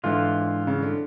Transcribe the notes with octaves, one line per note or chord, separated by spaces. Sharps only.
G#2 D3 E3 F4
C#3
D3